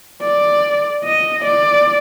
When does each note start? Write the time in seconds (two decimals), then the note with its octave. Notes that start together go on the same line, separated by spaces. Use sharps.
0.22 D5
1.05 D#5
1.44 D5